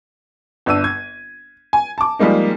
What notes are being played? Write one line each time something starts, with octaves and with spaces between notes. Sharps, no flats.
G1 D4 E6 D#7
G#6
G#5
A5 D6
F3 G3 G#3 A#3 D#4